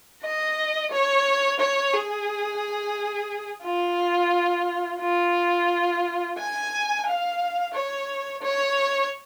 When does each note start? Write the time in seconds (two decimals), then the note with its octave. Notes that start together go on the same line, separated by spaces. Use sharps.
0.23 D#5
0.91 C#5
1.60 C#5
1.93 G#4
3.64 F4
5.01 F4
6.38 G#5
7.06 F5
7.74 C#5
8.42 C#5